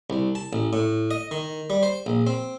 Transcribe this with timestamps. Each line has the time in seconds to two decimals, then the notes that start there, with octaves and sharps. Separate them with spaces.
0.10 C2
0.35 A5
0.53 A1
0.73 A2
1.11 D#5
1.31 D#3
1.70 G3
1.83 C5
2.06 A#1
2.27 C4